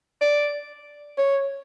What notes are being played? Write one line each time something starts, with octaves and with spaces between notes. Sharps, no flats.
D5
C#5